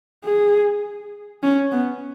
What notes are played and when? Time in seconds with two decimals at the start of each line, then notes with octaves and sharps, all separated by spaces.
0.24 G#4
1.43 C#4
1.72 B3